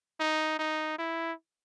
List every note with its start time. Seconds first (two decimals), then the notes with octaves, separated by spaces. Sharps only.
0.20 D#4
0.59 D#4
0.98 E4